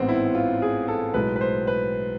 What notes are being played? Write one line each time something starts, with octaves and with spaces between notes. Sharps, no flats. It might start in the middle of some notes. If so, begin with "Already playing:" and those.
Already playing: A1 G#2 G#3 B3 C4
E4
F4
G#4
A4
B1 A2 G#3 B4
B4
C5
B4